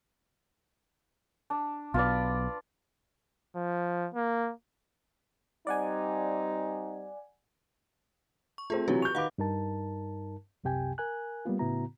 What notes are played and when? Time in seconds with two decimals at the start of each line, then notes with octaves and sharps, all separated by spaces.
1.50 D4
1.94 B1 B3 F4 B4 D5
3.56 F3
4.14 A#3
5.67 G3 C4 D#4 D5 F#5 G#5
8.58 C#6
8.70 A3 C4 F4 G#4
8.88 C3 E3 F#3 F#4 G4 B4
9.02 C#6 G6 F7
9.15 D#3 B4 F5 F#5 D6
9.38 G2 D#4 A#4 A5
10.64 C2 F#2 C3 G4 G5 G#5
10.98 A#4 G#5 F#6
11.45 G3 A#3 B3 F4
11.59 A2 C#3 B3 E4 F#4 A#5